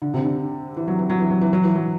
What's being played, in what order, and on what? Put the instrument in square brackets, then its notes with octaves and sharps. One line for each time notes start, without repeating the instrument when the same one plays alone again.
[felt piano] D3
C3
D3
E3
F#3
E3
F#3
E3
F#3
E3
F#3
E3
F#3